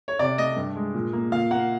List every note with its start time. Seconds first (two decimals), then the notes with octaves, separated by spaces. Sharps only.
0.08 C#5
0.19 C3 D5
0.38 A3 D#5
0.56 G2
0.76 G#3
0.94 A#2
1.13 A#3
1.32 A#2 F5
1.51 A#3 F#5